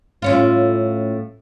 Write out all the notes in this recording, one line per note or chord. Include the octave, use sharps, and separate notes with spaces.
A2 C#4 F4